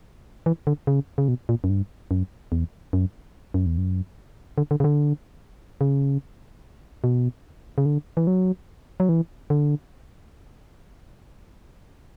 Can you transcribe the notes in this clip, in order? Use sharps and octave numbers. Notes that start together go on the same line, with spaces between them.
E3
D3
C#3
C#3
B2
A#2
F#2
G2
F#2
E2
F#2
F#2
E2
F#2
D3
D3
C#3
D3
C#3
B2
C#3
D3
E3
F#3
F#3
E3
D3